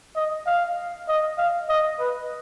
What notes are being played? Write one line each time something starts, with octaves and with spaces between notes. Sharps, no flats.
D#5
F5
D#5
F5
D#5
B4